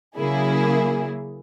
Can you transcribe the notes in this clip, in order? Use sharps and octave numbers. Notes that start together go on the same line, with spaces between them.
C#3 F#3 A#3 E4 G#4